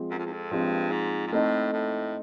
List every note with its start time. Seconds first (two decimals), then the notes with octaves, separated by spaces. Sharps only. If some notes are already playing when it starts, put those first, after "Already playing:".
Already playing: F3 G#3 C4
0.11 F#2
0.18 F2
0.25 E2
0.32 F2
0.51 G2 F3 G#3 C4
0.91 G#2
1.27 G#2
1.32 A2 A3 C4 D#4
1.73 A2